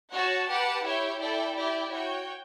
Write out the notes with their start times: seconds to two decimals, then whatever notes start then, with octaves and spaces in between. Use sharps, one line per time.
0.13 F#4 C#5 F#5 A5
0.48 G4 B4 F#5 A5
0.84 E4 G4 C#5 G5
1.21 E4 A4 D5 G5
1.56 E4 G4 D5 G5
1.92 F#4 C#5 G5